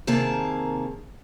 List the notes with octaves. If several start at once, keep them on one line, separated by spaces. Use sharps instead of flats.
C3 D#3 A#3 G#4 A5